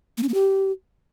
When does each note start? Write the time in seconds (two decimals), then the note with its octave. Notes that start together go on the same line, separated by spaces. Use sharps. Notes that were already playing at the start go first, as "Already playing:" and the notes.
0.17 A#3
0.23 C#4
0.29 A#3
0.34 G4